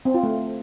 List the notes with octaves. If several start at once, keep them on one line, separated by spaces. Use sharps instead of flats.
C4
F4
A3